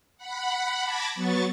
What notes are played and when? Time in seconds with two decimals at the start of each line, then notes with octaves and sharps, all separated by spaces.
0.18 F#5 B5
0.83 A5 B5 D6 G#6 A#6
1.15 F#3 B3 C#6 A6